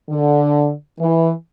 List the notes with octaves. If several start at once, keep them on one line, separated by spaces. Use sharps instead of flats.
D3
E3